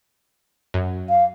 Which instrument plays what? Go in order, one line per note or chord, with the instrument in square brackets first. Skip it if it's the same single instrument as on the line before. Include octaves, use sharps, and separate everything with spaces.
[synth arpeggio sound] F#2
[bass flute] F5